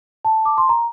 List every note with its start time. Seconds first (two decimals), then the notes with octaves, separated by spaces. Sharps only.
0.25 A5
0.45 D6
0.58 C6
0.69 A#5